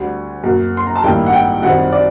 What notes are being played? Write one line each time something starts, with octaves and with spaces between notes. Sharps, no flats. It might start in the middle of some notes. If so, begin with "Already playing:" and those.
Already playing: D2 D3 G3
F#2 F#3 A#3
C6
A#5
A5
A1 G2 D#3 G3 A#3 G5
F#5
G5
F#2 D#3 G3 C4 F#5
D5